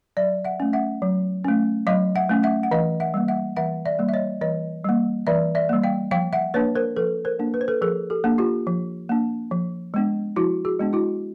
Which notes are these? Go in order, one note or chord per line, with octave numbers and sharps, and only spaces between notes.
F#3 D5 E5
E5 F#5
A3 C#4
E5 F#5
F#3
A3 C#4
F#3 D#5 F5
E5 F#5
A3 C#4
E5 F#5
F#5
E3 D#5 F5
E5 F#5
G3 A#3
E5 F#5
E3 E5 F#5
D5 E5
G3 A#3
E5
C#5 D#5
E3 C#5 D#5
G3 A#3
E3 D5 E5
D5 E5
G3 A#3
F5 G5
F3 F5 G5
E5 F#5
A#3 D4 B4 C#5
A#4 C5
F3 A4 B4
A#4 C5
A#3 D4
B4
C5
A4 B4
F3 G#4 A#4
G4 A4
A#3 D4
F4 G4
F3
A#3 D4
F3
G#3 B3 D4
F3 E4 F#4
F#4 G#4
G#3 B3 D4
E4 F#4